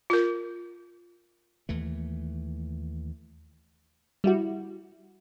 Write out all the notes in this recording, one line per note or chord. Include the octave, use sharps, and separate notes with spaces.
F4 A#4
D#2 E3 A3
G3 E4 F#4